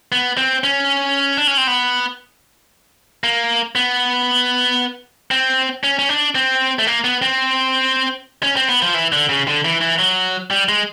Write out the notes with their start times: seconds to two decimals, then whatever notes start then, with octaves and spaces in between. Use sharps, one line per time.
0.12 B3
0.38 C4
0.64 C#4
1.37 D4
1.47 C#4
1.57 C4
1.67 B3
3.24 A#3
3.75 B3
5.31 C4
5.84 C#4
5.99 C#4
6.09 D4
6.35 C4
6.79 A3
6.87 A#3
7.04 B3
7.22 C4
8.43 C#4
8.56 C4
8.69 B3
8.82 F3
8.94 E3
9.12 D3
9.29 C#3
9.48 D3
9.65 E3
9.81 E3
9.99 F#3
10.51 G3
10.69 G#3